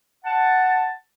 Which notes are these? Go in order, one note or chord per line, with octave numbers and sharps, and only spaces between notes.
F#5 A5